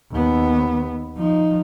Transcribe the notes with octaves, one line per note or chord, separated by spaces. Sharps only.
D#2 B3
F3 D#4